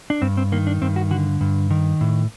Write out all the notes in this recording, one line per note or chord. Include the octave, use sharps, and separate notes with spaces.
D4
G2 C4
C4
D#3 A#3
D4
G2 C4
F#4
D3 F#4
G2
D#3
A2